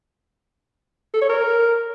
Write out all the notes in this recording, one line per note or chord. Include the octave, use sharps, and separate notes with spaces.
A4
C#5
A#4